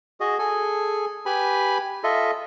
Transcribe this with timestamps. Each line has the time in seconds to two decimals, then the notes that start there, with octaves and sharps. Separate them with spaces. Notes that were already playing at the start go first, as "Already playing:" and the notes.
0.20 F#4 G#4 D#5
0.39 G#4 A4 G#5
1.26 G4 B4 G#5 B5
2.04 F4 A4 D#5 E5